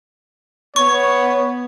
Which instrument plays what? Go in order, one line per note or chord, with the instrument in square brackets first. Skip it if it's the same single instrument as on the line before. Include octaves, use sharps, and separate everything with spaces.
[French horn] B3 [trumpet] C#5 [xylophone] C#6